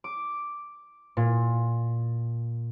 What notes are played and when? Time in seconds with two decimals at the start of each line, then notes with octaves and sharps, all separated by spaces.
0.04 D6
1.17 A#2